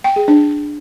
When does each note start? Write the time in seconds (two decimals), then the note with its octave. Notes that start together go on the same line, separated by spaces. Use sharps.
0.04 G5
0.16 G#4
0.28 D4